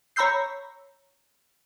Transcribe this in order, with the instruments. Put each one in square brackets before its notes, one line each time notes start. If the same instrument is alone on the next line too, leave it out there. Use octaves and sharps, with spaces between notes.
[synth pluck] C#5 A#5 B5 E6 G6 C7